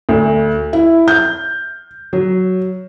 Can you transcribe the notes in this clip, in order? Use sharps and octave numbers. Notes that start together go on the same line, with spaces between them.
D2
E4
G6
F#3